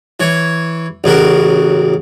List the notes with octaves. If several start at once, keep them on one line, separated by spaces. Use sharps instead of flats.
E3 C#5
A1 C#3 F#4 A#4